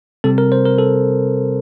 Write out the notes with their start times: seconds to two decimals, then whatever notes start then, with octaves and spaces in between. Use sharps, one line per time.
0.24 C3 G3 C4 A4
0.38 A#4
0.52 C5
0.65 A#4
0.79 A4